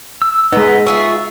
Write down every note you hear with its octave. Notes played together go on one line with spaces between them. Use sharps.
E6
G#3 B3 D#4 D#5 F#5
F4 G#4 E5 C#6